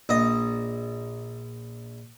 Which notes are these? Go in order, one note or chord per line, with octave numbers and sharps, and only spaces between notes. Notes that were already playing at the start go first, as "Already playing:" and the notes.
A#1 D#5